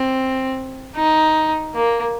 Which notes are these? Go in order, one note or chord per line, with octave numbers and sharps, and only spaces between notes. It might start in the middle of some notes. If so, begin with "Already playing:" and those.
Already playing: C4
D#4
A#3